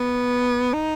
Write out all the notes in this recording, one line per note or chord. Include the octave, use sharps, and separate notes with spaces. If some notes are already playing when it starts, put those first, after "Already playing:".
Already playing: B3
D#4